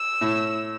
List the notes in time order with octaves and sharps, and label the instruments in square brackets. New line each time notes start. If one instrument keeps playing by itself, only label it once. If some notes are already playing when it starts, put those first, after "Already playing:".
Already playing: [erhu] E6
[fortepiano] A2